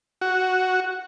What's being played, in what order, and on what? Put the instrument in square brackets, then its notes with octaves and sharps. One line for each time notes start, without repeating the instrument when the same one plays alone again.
[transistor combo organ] F#4